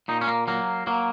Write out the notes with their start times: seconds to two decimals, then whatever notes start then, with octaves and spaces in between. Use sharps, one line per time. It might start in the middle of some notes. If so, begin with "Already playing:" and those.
0.08 A#2 D#4
0.21 C#4
0.28 A#3
0.48 F#3 A#3
0.87 F#3 A#3